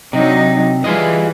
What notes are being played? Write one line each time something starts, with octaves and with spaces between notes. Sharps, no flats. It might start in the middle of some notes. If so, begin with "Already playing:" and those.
C3 F#3 D4 D#4
E3 G3 F4 G#4 D#5